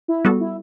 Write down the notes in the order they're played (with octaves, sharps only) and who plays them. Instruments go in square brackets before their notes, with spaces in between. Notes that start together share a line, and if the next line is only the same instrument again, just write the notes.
[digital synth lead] E4
[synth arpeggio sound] G3 B3 F#4 A4
[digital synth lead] E4